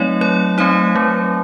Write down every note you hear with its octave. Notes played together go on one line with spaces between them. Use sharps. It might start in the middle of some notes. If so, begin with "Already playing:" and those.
Already playing: F#3 A3 C4 D#4 C#5 D#5
F#3 C#5
A3 C4 D#4 C5
F#3